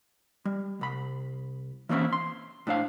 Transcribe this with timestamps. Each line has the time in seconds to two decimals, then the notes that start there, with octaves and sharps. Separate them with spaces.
0.45 G3
0.81 C2 B5
1.89 E3 A#3 C4 C#4 E4
2.13 C6
2.67 A2 D4 C5 F5